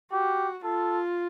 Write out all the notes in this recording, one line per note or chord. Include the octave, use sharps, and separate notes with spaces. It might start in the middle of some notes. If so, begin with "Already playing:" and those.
F#4 G4
F4 A4